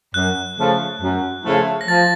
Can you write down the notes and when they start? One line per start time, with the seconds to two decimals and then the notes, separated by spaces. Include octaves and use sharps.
0.14 F#2 F#6
0.58 C#3 F3 A3
1.02 F#2
1.45 C#3 F3 A3
1.81 A#6
1.88 F3 A6